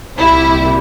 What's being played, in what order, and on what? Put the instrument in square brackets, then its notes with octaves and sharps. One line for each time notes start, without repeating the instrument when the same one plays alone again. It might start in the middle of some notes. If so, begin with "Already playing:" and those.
[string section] C2 A#2 G3 E4